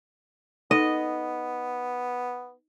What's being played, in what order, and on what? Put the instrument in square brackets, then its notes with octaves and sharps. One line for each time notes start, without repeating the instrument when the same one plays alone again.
[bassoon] B3 [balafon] D#4 A4 [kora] D#5